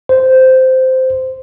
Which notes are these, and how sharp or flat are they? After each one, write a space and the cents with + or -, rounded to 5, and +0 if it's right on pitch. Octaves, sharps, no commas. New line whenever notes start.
C5 -10